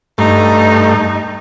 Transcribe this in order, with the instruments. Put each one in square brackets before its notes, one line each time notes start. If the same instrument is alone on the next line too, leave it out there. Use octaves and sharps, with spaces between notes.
[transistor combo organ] G2 A3 [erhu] D#4